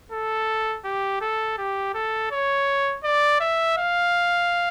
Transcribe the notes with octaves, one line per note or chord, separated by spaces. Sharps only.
A4
G4
A4
G4
A4
C#5
D5
E5
F5